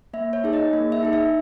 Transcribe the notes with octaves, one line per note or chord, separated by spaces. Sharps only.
A#3 E5
C#5
D#4 G#4
D#5
A#3
E5
D#4 G#4
E5